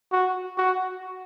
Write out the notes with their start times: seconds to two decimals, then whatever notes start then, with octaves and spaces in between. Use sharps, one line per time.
0.12 F#4
0.58 F#4